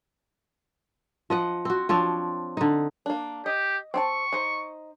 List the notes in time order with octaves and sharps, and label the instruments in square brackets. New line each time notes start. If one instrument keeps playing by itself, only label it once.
[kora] F3 D#5 F#5
C4 F#4
F3 C4 D4 C#5
D3 D#4
[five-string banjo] A#3 D4
[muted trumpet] G4 [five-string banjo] D#5
[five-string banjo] C4 D#5 A5 [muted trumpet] C#6
[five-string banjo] D#4 C5